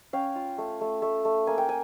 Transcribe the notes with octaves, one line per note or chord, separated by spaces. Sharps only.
C#4 F5 G5
F4
A3
A3
A3
A3
A#3 G#5
G5
G#5